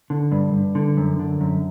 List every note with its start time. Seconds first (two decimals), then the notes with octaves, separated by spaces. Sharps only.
0.10 D3
0.32 G2
0.54 G2
0.75 D3
0.97 F#2
1.19 D3
1.41 F#2